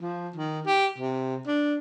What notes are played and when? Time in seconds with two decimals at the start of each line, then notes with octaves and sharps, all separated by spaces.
0.01 F3
0.36 D#3
0.66 G4
0.98 C3
1.46 D4